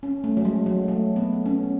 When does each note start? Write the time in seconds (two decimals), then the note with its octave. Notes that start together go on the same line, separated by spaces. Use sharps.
0.03 C#4
0.24 A3
0.37 F#3
0.45 G#3
0.66 F#3
0.88 A3
1.16 B3
1.46 C#4